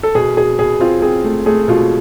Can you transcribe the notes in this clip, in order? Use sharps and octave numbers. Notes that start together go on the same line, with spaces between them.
A4
B2 G#4
B2 G#4
B2 G#4
C4 F4
C4 G#4
A3
A3 G#4
B2 F4